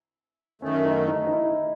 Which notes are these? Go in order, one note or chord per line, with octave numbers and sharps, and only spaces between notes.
F#2 D#3 A3 C#4
D#4
D#4
D#4
E4